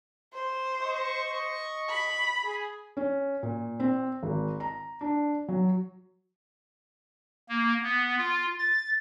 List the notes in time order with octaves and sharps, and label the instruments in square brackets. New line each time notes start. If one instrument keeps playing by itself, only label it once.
[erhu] C5
[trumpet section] D#5 C#6
[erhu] B5
[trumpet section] G#4
[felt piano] C#4
A#2
C4
G#1
A#5
D4
F#3
[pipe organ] A#3
B3
F4
A6